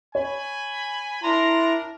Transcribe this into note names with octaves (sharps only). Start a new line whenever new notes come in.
C#5 G#5 B5
D4 E4 A#4 A#5 C6